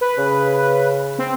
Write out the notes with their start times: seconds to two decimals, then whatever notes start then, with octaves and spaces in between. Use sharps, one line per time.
0.01 B4
0.18 C#3
1.18 C4